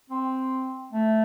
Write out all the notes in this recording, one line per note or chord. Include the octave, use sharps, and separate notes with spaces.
C4
A3